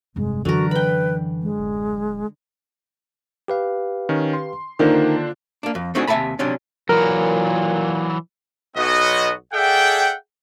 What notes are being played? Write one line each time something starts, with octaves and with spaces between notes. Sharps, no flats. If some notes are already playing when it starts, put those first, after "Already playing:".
F1 G2 G#3
F#2 D3 E3 F#4 A#4
B4 G5 B5
G#3
D1
G4 B4 F5
D#3 C#4
C6
D3 D#3 A#3 D4 F4 C5
A#3 D4
F2
A3 C4 D4 D#4 F#4 G#4
D#2 C3 E5 G#5 A5 B5
C3 F#3 C#4 D4
A#2 E3 F#3 A#4
B1 B3 F#4 D#5
G#4 A4 D5 E5 F#5 G5